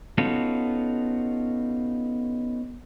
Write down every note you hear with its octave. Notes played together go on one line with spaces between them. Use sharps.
B3 C#4 D#4 F4 F#4 A4